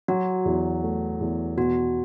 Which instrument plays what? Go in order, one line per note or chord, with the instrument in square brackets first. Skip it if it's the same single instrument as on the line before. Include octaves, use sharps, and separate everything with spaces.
[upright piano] F#3 [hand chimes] F#4
[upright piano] E2
A3
E2
[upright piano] B2 [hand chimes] F#4